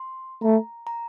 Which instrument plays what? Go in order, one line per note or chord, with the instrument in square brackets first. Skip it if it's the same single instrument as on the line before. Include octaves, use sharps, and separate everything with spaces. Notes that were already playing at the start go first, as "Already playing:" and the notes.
Already playing: [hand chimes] C6
[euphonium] A3 [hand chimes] A#5
[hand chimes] A#5